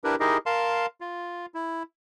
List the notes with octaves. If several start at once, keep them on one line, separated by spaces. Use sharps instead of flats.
D4 E4 G4 A#4 B4
D#4 E4 G4 G#4 A#4 D#5
A#4 F5 A5 C6
F4
E4